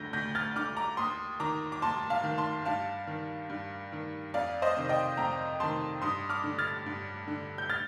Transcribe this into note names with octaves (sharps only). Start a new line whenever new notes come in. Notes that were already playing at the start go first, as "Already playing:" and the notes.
Already playing: D2 D3 G6 A#6
D2 G6 A#6
F6 A6
D3 D6 F6
A#5 D6
D#2 C6 D#6
D#3 A#5 D6
D6
D#2 A5 C6
F5 A5
D#3
A5 C6
G2 F5 A5
D#3
G2
D#3
F2 D5 F5
C5 D#5
C3 D#3
D#5 G5
F2 G5 A#5
C3 D#3 A5 C6
G2 C6 D#6
D6 F6
D3
F6 A6
G2
D3
G6
F6 A6